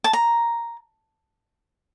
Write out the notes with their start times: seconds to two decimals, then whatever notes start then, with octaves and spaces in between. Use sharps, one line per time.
0.04 A5
0.13 A#5